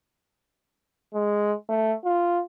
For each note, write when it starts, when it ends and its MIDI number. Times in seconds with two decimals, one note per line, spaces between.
1.14 1.54 56
1.69 1.94 57
2.04 2.41 65